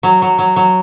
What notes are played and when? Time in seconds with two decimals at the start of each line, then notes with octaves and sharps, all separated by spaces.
0.03 F#3
0.22 F#3
0.38 F#3
0.56 F#3